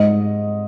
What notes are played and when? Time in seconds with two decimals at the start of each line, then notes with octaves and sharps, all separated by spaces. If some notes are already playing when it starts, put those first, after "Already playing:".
Already playing: G#2 D#5